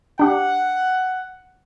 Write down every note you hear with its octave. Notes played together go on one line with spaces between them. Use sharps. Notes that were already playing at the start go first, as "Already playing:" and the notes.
D4 G4 F#5